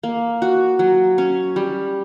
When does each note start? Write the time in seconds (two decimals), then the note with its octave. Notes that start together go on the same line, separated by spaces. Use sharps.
0.03 A#3
0.42 F#4
0.79 F#3
1.18 C#4
1.56 G3